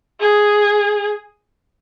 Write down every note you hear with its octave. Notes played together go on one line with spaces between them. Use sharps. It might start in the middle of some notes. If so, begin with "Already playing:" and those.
G#4